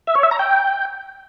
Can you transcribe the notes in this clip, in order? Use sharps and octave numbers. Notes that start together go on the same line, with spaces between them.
E5
C#5
E5
A#5
G5